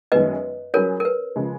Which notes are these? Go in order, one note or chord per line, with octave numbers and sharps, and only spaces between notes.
F#2 D#3 G#3 B3 B4 D#5
F#3 C#4 G#4 A#4 B4 C#5
A#4
B4
C#3 F3 G#3